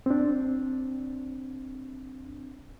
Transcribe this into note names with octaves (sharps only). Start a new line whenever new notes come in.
C4 D4